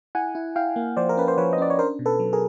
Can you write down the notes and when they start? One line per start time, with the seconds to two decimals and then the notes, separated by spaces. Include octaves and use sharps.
0.15 E4 F#5 G#5
0.35 E4
0.56 E4 F5 G5
0.76 A#3
0.97 F3 C5 D5
1.09 A#4
1.17 C#4 B4
1.28 C5
1.38 F3 B4 C#5
1.53 D#5
1.58 C#4 D5
1.70 C#5
1.79 D4 A#4 C5
1.99 B2
2.06 A4 B4
2.19 F#3
2.33 G#4 A#4